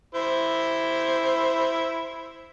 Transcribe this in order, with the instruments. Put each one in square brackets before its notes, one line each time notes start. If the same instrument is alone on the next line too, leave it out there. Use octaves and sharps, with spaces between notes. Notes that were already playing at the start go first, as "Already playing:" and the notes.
[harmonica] E4 C5